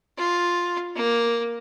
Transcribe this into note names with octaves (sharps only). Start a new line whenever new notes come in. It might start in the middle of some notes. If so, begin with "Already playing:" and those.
F4
A#3